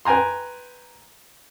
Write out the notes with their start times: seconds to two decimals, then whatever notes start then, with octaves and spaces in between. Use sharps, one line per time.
0.05 B4 G5 G#5 A#5 C6